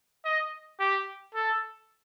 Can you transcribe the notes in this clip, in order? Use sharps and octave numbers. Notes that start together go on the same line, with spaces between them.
D#5
G4
A4